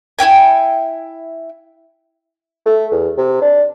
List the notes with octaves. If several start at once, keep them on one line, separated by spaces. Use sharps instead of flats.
E4 C#5 G5 G#5
A3
E2
C3
D4